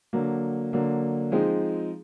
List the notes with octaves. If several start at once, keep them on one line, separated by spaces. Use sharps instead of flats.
D3 F#3 A#3
D3 F#3 A#3
F3 G#3 C4 D#4 G#4